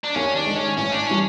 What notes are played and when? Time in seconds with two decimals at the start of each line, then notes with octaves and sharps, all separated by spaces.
0.05 D4
0.16 D#2 C#4
0.36 D4
0.46 D#3 G#3
0.57 C#4
0.77 A1 C#4
0.92 D4
1.07 E3 G3 C#4